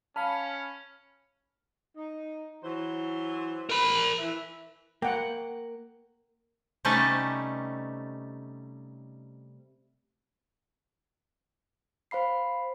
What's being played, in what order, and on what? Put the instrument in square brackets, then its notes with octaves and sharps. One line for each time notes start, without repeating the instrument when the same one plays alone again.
[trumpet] C#4 [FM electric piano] F5 B5 F6 [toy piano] A5
[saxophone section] D#4
E3 F#3 C5
[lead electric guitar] A#4 B5
[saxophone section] E3 E5
[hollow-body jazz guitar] A#3 [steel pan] F#5 G5
[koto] C3 G3 A3 C#4 D#4 A4
[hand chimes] C5 F5 B5 C7